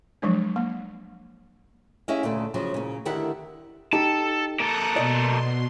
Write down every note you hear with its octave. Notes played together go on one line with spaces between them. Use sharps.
F3 F#3 G#3 D4
A#3
C#4 E4 G4 G#4 D#5 F5
D2 A#2 C#3 A4 D5
C#3 F3 F#3
A#2 C#3
D3 D#3 E4 G4 F#5
D#4 G4 A4 A5
A#3 A4 A#5 D#6 F#6
B2 D5 D#5 C6